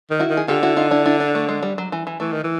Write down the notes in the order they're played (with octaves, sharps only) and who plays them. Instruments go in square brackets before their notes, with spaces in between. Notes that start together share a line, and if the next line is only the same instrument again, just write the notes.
[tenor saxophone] D#3
[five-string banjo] E4 F#4
[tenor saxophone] D#3
[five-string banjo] G#4
[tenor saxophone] D3 [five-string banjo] F4 G4
[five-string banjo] E4 F#4
D#4 F4
D4 E4
D4 E4
D4
A3
G#3
G3
F#3
E3
E3
[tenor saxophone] E3 [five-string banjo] A3
[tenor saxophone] D#3
E3